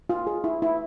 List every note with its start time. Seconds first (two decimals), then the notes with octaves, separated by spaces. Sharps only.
0.10 F4
0.27 G#4
0.44 E4
0.62 E4